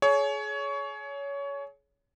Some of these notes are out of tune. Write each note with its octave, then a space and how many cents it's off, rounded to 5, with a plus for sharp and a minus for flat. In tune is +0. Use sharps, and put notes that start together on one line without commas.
G#4 +35 C#5 +20